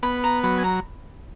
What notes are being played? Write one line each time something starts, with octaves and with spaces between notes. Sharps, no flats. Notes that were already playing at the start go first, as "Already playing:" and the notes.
B3 B5
A#5
F#3 B5
G#5
A#5